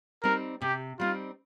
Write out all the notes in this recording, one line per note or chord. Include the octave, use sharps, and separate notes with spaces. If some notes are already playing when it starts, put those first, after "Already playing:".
G3 C4 D#4 A#4
C3 G4
G3 C4 D#4 F4